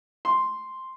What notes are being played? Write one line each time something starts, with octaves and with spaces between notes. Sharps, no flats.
C6